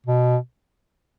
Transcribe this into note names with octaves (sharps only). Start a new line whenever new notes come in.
B2